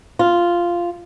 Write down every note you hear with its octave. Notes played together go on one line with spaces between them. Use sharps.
F4